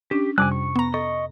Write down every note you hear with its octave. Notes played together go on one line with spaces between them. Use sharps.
C#4 D4 G4
F2 C3 G3 G#5 D6 F#6
C#6
B3 A#5
A4 D#5 C#6